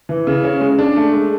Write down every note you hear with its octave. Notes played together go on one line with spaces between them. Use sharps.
E3
C#3
C#4
G#3
D4
A3
G#3